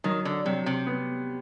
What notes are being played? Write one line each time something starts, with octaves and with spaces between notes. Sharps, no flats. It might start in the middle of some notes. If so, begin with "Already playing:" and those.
D#3 F#3
D3
C3 F#3
C3
B3